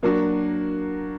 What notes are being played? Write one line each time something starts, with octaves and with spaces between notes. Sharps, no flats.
F#3 A#3 D4 F#4